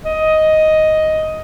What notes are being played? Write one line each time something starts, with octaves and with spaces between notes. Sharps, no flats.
D#5